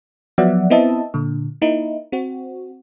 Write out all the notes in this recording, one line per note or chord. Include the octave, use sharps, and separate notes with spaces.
F3 F#3 B3 D5 E5 F#5
B3 C4 E4 D#5 E5 A5
A#2 D3
A#3 D#4 E4
C4 F#4